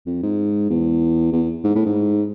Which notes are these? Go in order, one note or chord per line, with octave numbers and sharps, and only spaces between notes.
F2
G#2
E2
E2
G#2
A2
G#2